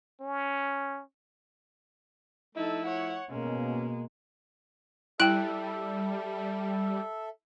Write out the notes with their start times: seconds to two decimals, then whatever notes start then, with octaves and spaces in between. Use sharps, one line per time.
0.20 C#4
2.56 F3 A3 D#4 E4 A4
2.86 C#5 F#5
3.30 B2 G#3 A#3 C#4
5.20 G3 E4 A4 E5 G5 F#6 D7 F#7